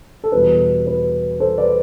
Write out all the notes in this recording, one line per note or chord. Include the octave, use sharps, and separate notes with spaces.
A4
E2 B2 G3 B3 B4
B4
A4 C5
B4 D5